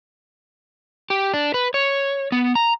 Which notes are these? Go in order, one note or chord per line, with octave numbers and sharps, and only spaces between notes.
G4
D4
B4
C#5
B3
A#5